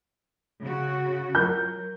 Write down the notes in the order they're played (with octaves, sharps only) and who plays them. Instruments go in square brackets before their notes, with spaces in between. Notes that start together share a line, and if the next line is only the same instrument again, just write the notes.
[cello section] C#3 F#4
[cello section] F#3 [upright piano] A#4 G6